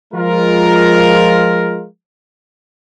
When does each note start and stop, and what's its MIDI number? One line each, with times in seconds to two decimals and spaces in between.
0.14 1.86 53
0.14 1.86 56
0.14 1.86 65
0.14 1.86 70